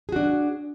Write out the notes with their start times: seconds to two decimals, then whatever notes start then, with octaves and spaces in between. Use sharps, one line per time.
0.09 G#4
0.12 F#4
0.16 D4